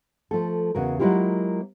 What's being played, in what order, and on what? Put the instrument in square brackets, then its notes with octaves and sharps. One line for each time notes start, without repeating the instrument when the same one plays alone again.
[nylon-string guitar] F3 A3 A4
E2 C#3 F#4 A#4
F#3 G#3 A#3 E4 F4 G4